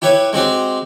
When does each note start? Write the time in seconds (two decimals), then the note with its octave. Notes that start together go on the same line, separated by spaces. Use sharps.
0.02 E4 G4 B4 C#5
0.33 G#3 C4 F#4 G4